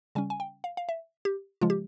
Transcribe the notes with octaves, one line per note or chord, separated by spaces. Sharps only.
C#3 G3 C#4 G#5
G#5
G5
F5
F5
E5
G4
C#3 F3 G#3 F4
G4